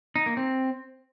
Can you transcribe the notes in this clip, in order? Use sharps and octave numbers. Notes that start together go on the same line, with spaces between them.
D#4
A#3
C4